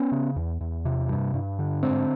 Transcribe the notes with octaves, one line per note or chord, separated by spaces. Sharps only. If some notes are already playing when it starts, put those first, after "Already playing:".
Already playing: B3 C#4
C#3
E2
E2
C3
G2
G2
D3
G#2 C4 D4